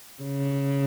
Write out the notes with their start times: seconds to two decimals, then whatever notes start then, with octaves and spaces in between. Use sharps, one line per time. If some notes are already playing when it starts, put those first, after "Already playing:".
0.23 C#3